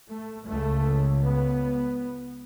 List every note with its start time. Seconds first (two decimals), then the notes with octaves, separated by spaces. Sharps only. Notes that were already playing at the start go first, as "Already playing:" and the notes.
0.09 A3
0.47 C#2 C#3 A3
1.24 B3